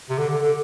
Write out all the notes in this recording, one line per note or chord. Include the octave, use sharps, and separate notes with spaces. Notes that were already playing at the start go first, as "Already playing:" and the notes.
C3
D3
D3
D3